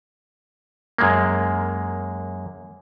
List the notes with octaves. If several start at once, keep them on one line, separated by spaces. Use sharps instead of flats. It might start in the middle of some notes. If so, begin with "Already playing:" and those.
F#2 G#3 A#3